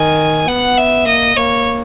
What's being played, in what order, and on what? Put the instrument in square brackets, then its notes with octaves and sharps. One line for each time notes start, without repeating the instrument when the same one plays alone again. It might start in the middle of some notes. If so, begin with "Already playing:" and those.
Already playing: [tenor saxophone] D#3 [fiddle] G#5
[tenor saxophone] B3 [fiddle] F#5
[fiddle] E5
[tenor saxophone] A#3 [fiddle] D#5
[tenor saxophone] A#3 [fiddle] C#5